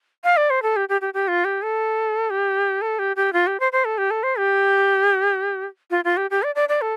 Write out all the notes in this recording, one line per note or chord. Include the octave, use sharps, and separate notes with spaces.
F5
D5
C5
A4
G4
G4
G4
G4
F4
G4
A4
G4
A4
G4
G4
F4
G4
C5
C5
A4
G4
A4
C5
G4
F4
F4
G4
G4
D5
D5
D5
A4